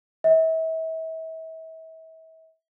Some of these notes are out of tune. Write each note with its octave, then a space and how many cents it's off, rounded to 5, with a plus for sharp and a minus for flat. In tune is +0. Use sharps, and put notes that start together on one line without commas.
E5 -35